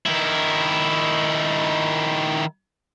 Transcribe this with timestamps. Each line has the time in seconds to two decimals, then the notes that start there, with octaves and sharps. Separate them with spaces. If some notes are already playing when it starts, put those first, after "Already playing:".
0.06 D#3 E4